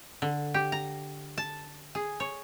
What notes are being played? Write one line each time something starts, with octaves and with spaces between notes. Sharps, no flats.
D3
G4
A#5
A5
G#4
C#5